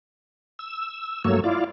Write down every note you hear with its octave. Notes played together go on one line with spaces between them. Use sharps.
E6
G2 F#3 A3 A#3 C#5 E6
E4 F4 D5 F5